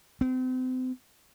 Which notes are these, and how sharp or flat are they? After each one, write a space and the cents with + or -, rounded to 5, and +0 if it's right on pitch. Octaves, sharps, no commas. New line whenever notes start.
C4 -35